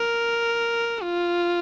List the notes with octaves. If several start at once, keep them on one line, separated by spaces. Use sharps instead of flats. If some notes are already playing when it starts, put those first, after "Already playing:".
Already playing: A#4
F4